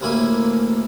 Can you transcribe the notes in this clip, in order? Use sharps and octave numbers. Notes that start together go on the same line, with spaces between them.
A1 D2 A#3 E4 G#5